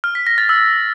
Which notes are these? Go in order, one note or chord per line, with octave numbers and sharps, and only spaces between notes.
F6
B6
A#6
A6
E6